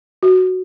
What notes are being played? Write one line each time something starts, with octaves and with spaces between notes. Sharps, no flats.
F#4